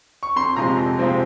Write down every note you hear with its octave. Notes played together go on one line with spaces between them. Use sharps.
C#6
F2 C6
C3 F3 G#3 C4 A#5
F2
C3 F3 G#3 C4